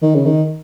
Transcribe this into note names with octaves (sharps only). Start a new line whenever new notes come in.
D#3
C#3
D#3